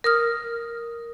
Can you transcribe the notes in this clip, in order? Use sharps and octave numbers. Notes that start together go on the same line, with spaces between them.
A#4 D#6 F6